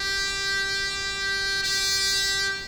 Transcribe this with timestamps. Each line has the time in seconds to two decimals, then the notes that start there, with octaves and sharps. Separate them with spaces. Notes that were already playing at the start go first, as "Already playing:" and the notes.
Already playing: G4
1.63 G4